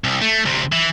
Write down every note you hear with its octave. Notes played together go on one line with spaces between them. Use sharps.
C2
A3
D2 C3
E3